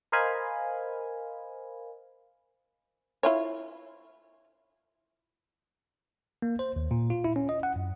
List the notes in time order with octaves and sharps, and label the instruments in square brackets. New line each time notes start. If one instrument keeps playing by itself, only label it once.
[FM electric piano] A#4 C5 D#5 F5 G#5 B5
[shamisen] E4 F4 C#5
[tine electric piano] A#3
C5
D#2
A#2
F4
E4
C#4
D#5
F#5
F#2